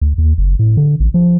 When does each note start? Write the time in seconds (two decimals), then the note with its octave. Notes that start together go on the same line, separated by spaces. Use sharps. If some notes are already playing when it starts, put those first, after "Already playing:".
0.01 D2
0.18 D#2
0.38 F#1
0.59 A2
0.77 D3
1.00 A1
1.14 F3